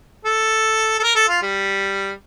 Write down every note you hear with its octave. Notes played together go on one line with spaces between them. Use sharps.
A4
A4
A#4
A4
F4
G3